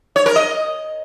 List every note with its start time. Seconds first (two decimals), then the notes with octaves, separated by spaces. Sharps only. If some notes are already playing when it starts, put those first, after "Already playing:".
0.16 C#5
0.26 A#4
0.36 D#5